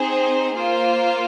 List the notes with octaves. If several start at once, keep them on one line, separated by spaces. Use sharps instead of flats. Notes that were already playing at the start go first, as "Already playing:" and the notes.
Already playing: C4 D#4 G#4 C5
A#3 F4 C5